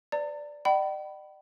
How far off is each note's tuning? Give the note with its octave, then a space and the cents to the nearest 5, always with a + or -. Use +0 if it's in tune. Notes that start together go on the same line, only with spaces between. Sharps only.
B4 +45 D5 +0 A#5 -40
D5 +45 G5 -45 B5 +0